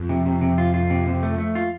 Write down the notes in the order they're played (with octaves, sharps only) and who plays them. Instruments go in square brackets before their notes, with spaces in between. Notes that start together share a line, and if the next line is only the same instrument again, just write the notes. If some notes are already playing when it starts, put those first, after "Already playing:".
Already playing: [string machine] F2
[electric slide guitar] C3
C3
C3
F4
F4
C3
C3
A3
A3
F4